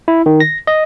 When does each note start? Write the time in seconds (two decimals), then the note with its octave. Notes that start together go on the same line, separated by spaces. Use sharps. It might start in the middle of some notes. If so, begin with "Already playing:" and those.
0.08 E4
0.26 D#3
0.40 A#6
0.67 D#5